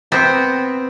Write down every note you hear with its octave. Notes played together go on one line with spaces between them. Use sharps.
B3 C4